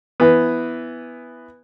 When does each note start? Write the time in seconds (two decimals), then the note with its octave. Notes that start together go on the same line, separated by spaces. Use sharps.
0.20 E3 B3